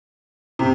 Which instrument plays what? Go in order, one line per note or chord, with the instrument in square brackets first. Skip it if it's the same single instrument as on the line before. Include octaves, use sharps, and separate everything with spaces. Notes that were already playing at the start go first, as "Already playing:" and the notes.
[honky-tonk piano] C3